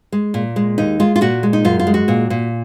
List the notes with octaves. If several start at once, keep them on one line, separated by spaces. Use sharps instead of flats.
G#3
A#2
G#3
D#2 D#4
G#3 F4
F4
A#2 F#4
G#3
D#4
F#2 F4
F4
G#3
F#4
A#2
A#2